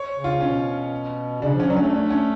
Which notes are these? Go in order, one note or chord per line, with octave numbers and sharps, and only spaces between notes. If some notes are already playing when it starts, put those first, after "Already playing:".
Already playing: C#5
C#3
F4
B2 C#4
C#3 D4
F3 C#4
F#3 D4
A3 C#4
D4
C#4